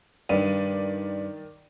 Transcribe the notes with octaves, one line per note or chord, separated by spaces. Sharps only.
G2 D#3 D5 D#7